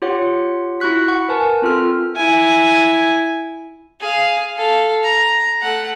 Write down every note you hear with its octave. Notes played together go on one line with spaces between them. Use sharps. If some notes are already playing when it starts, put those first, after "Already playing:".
F4 G4 C#5 F#5
E4 F#4 C#6 F#6 B6
F#5 C#6
A#4 B4 G#5 A5
C4 F4 A4 F6
E4 G#5
G#4 F5
A4 F5
A#5
A3 F#5